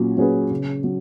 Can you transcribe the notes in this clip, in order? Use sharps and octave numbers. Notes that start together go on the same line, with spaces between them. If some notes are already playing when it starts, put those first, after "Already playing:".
Already playing: A#2 F#3 C#4
F#3 C#4 G#4 B4
C#3
F#3